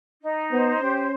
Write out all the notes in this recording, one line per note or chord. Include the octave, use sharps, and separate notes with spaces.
D#4
B3 C5
C#4 G4